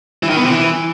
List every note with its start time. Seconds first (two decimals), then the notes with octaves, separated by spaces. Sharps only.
0.23 E3
0.30 D#3
0.37 B3
0.44 C3
0.51 E3